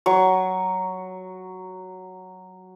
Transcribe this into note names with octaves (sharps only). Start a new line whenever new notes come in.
F#3 C#6